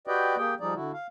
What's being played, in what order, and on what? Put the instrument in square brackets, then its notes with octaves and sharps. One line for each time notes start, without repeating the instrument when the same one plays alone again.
[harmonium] F#4 G4 B4 D5 D#5 G5
A#3 G4 G#4 G5
F3 G3 D#4 G#4 D5
D3 E4 F#4
F5